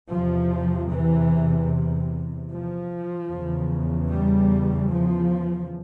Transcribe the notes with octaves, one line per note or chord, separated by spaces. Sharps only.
E2 C3 F3
E3
F3
E2 C#3
G3
F3